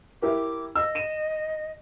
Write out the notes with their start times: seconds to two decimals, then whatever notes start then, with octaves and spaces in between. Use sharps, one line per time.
0.22 E4 G4 A#4 D6
0.75 D#5 E6
0.95 D#7 E7